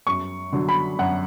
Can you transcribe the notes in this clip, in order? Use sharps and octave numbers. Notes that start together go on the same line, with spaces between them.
F#2 C#6
D3 F#3
B5
F#2 F#5